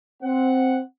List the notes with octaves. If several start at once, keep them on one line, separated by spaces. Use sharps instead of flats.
C4 F#5